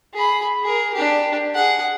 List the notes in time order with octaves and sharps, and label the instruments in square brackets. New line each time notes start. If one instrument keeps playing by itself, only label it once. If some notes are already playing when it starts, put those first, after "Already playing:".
[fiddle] G#4 B5
G#4 A#4
D4 G4
G#4 F#5